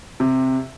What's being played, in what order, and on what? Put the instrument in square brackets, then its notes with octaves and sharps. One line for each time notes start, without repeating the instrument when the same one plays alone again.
[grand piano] C3